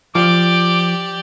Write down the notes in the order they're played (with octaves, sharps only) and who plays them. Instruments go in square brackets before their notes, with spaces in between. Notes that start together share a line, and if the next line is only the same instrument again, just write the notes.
[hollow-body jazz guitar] F3 [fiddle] G4 D5 [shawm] D6